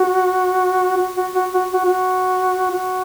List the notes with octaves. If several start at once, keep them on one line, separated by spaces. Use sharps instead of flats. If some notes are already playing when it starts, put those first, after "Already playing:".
Already playing: F#4
F#4
F#4
F#4
F#4
F#4
F#4
F#4